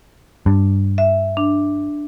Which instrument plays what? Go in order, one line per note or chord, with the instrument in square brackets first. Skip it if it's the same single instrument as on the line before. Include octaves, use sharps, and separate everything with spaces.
[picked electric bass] G2
[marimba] E5
D4